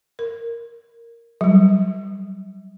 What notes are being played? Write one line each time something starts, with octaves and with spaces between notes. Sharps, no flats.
A#4
F#3 G3